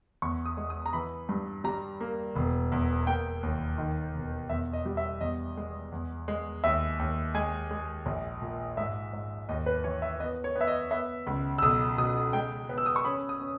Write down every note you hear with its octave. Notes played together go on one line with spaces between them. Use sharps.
E2 C#6
D#6
G#3
D#6
A#5
E3 B5
G2
G3 A#5
A#3
E1
E2
A#3 G5
D#2
D#3
E1
E2 E5
D#5
G3
E5
E2 D#5
G#3
E2
G#3
D#2 E5
D#2
G#3 G#5
G#3
A#1
A#2
G#2 E5
G#2
D#2 D#5
B4
E3 C#5
E5
B3 D#5
C#5
B3
E5
D#5
B3 E5
C#2
E6
B1 D#6
B2 D#6
G#3 G5
B3
E6
D#6
C#6
C#4 B5
D#6
C#4